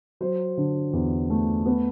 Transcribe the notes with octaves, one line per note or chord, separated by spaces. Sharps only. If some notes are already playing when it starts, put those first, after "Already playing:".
F#3 C5
D3
E2
A3
B3